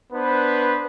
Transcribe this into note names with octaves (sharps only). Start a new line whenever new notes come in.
B3 D4 B4 C5